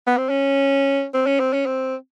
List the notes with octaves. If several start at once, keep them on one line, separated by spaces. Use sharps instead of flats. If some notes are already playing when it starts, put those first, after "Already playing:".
B3
C4
C#4
C4
C#4
C4
C#4
C4